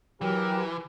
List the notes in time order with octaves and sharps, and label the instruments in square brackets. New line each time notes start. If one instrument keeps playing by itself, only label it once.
[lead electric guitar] E3 [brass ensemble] F#3 G4 A#4